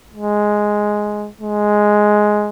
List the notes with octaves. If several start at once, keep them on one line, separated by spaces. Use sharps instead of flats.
G#3
G#3